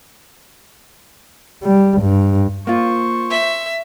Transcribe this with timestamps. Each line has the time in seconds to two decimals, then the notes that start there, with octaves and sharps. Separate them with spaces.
1.64 G3
2.01 G2
2.67 A#3 F4 C5 C#6
3.30 E5